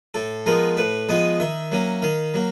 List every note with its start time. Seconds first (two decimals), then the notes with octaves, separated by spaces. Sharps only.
0.14 A2 A4
0.46 F3 G#3 B3 A#4
0.77 A2 B4
1.09 F3 G#3 B3 D#5
1.40 D#3 E5
1.72 F#3 A#3 C#4
2.02 D#3 F5
2.34 F#3 A#3